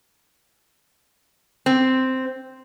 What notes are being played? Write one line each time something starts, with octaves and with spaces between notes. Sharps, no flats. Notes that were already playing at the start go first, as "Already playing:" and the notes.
C4